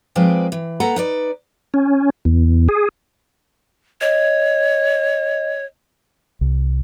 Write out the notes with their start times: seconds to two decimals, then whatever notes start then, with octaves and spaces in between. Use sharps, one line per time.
0.15 F3 G#3 C4 B4 D5
0.52 E3
0.80 A#3 A4 B4 F#5 A#5
0.96 D#4 B4 D5
1.74 C#4
2.25 E2
2.69 G#4
4.01 C#5 D#5
6.41 C2